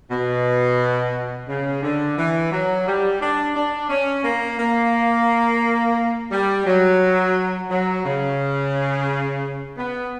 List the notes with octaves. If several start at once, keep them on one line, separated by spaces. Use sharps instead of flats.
B2
C#3
D3
E3
F#3
G3
D4
D4
C#4
A#3
A#3
G3
F#3
F#3
C#3
B3